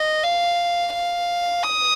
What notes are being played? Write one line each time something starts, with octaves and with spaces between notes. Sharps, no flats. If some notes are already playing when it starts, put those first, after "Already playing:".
Already playing: D#5
F5
F5
D#6